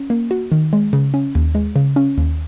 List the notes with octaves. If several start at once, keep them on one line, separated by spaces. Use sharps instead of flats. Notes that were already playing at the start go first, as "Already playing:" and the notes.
Already playing: C#4
A#3
F#4
D#3
G#3
C#3
C#4
D#2
G#3
C#3
C#4
D#2